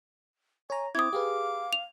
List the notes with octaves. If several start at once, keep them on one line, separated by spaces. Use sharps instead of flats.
C#5 G#5 A#5
C4 E4 D6 D#6 G#6
G4 G#4 B4 F5
F7